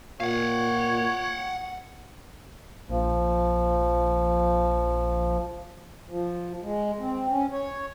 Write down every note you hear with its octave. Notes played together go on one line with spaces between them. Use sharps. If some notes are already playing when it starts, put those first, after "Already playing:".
A#2 C#5 F5 F#5
A#1 F3
F3
G#3
C4
C#4
C#5